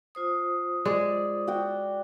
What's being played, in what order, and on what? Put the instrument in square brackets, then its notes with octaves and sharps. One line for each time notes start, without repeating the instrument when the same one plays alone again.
[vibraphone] F4 C5 D#6
[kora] G#3 [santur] D5
[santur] F#4 G5